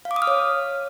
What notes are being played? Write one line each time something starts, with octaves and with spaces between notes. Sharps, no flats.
F5
D6
D#6
F6
C#5